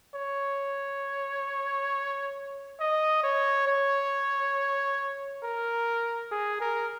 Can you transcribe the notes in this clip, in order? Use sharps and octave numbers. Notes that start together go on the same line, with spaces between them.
C#5
D#5
C#5
C#5
A#4
G#4
A#4